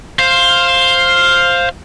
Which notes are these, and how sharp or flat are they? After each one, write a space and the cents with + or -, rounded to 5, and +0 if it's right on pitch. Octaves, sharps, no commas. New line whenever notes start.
C5 +10 F5 +0